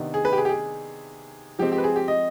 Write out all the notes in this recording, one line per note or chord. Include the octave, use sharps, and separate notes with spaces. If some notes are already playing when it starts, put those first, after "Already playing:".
Already playing: C3 D#3 B3 D4
G#4
B4
G4
G#4
G4
G#4
F3 G#3 C4 G4
G4
B4
G#4
G4
D#5